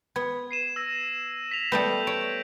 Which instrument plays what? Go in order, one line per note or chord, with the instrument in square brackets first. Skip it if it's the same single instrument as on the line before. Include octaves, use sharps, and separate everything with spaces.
[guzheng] B3 [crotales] G#6
[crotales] C7 D#7 E7
E6 A#6
B6 F7
[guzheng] G3 A3 B3 [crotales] G6
[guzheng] C#5 [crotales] D7